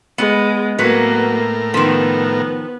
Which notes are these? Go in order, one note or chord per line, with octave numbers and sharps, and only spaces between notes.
G#3 B3
A2 F#3 A#3 B3 A#4 B4
D#3 F3 B3